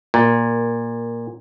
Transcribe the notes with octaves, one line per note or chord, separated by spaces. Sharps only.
A#2